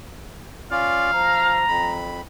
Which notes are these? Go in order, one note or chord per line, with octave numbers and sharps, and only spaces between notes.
C#4 F4 D5 F5
F3 A#5
F2 B5